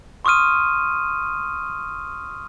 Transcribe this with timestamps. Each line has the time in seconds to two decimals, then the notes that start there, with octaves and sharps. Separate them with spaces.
0.25 C6 C#6 D#6 F6 D#7